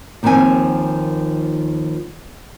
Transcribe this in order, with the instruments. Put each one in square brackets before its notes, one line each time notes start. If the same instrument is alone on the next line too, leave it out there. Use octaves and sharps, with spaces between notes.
[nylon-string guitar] D#2 D#3 F3 C4 G#5